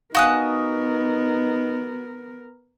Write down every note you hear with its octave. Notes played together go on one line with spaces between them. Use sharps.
B3 D#4 F#4 A#4 F5 G#5 D#6 F#6